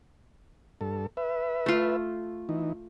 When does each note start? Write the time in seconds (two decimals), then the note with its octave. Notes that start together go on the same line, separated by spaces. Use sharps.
0.81 G2 A4
1.17 B4 E5
1.66 A3 F4
2.49 E3 D#4